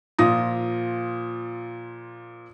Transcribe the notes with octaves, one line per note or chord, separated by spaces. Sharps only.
A#2 F3 F4 D#6 A#6